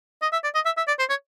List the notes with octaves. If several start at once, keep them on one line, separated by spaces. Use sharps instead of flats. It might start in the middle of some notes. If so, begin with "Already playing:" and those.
D#5
E5
D5
D#5
E5
E5
D5
C5
C#5